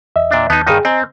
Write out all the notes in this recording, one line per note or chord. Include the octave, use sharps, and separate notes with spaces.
E2 D#5 E5
A#2 D4
D#2 B3 D#4 A5 G6
G2 D#3 D#4 G#4 G5
C4 D#5 G#5 A#5